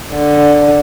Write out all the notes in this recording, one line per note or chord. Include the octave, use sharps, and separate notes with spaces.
D3